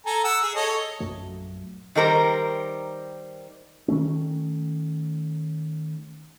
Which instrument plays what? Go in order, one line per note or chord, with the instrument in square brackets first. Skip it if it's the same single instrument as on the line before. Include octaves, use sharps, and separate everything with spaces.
[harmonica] A4 G#5 A#5
F#5 E6
G#4
A4 C#5 D#5
[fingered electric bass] A#1 F#2 F#3 A3
[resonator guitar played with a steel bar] D#3 G3 A#4 C5
[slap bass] D#3 A3 C#4